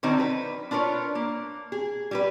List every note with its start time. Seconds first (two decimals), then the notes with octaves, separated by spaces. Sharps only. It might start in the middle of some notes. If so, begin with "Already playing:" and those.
0.03 D3 D#3 F#3 C4 D#4
0.20 B4
0.71 D4 F4 A#4 B4 C#5
1.15 A#3
1.72 G#4
2.11 G3 G4 B4